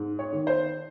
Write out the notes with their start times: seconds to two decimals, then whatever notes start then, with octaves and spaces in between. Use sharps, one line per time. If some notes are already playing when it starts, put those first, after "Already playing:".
Already playing: G#2
0.19 C#5
0.33 D#3
0.47 C5